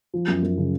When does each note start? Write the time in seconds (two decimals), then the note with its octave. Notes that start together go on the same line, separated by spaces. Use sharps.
0.14 F3
0.28 F#2
0.43 F#2
0.58 C#3